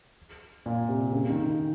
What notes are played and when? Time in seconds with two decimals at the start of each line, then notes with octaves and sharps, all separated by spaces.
0.66 A#2
0.89 C3
1.13 C#3
1.29 D#3
1.44 D#3